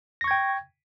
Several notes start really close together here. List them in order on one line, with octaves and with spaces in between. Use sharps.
A#6 C#6 G#6 G5